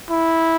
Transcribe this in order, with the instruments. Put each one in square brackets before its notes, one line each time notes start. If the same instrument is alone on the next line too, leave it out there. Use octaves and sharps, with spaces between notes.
[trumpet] E4